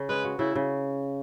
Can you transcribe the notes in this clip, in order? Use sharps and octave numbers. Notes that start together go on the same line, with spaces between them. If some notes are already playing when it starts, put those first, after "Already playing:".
Already playing: C#3
G#3 B4
F#4
C#3 E4
C#3